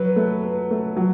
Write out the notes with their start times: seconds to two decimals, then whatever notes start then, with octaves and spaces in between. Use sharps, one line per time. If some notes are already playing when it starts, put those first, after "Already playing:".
Already playing: F#3 B4
0.16 A3
0.43 B4
0.71 A3
0.97 F#3